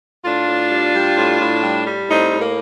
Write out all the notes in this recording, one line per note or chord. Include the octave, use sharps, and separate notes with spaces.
A2 D4 F4
A2
G3
G3
A2
A2
G3
G3
A2 C4 D#4
A2
A#3